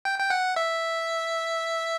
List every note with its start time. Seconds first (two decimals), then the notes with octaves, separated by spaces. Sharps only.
0.05 G5
0.19 G5
0.30 F#5
0.56 E5